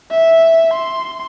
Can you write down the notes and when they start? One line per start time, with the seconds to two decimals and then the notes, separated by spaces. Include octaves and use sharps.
0.11 E5
0.73 C6